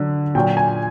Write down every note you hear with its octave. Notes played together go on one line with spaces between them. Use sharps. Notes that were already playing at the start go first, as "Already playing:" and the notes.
Already playing: D3 F#3
A#2 F#3 G5
G#5